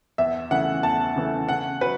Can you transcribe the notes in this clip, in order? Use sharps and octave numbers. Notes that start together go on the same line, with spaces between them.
E2 E5
C#3 E3 A3 F#5
E2 A5
C#3 E3 A3
C#3 F#5
F#3 B4